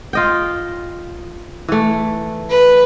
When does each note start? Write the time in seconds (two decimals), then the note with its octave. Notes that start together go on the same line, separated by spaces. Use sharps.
0.13 F4 D#5 G5
1.68 E3 A3
2.49 B4